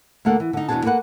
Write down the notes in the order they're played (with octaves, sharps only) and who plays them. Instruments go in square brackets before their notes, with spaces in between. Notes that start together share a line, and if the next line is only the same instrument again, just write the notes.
[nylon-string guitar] D2 D3 A#3 A4 F#5
E3
D3 D#4
E2 B2 F#3 D4 G#4 A5
A#3 A4 B4 F#5